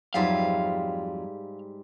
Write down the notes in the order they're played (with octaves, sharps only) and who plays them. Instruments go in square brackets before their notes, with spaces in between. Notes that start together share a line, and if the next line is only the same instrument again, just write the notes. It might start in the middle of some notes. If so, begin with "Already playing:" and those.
[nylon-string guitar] F2 F#3 F4 [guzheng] G#2 G3 E5 [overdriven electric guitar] F5